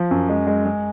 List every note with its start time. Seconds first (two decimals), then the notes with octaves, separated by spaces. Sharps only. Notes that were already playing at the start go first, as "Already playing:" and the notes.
Already playing: F3
0.11 F#2
0.29 G#3
0.47 G#3
0.66 G#3